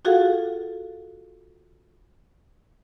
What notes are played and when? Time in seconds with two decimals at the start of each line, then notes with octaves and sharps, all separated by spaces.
0.05 F4 F#4 G#4 A4 F5 F#5